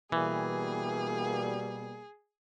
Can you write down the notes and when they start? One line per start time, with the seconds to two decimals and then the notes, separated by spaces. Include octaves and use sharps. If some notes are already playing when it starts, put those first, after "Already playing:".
0.12 B2 E3 G3 A#3 G#4